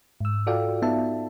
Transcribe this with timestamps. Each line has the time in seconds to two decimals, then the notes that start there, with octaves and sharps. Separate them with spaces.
0.20 G#2 E6
0.47 F4 F#4 A4 D5 F5 G5
0.82 B3 D#4 E5 A5